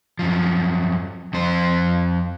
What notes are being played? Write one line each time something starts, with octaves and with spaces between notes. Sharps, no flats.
F#2 F3
F2 C5